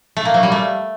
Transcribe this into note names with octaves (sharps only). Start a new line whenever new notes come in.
A3
A#3
F#3
G3
A3